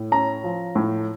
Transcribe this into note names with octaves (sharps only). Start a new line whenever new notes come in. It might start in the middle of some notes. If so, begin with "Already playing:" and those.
Already playing: A2
C#4 A#5
F3
A2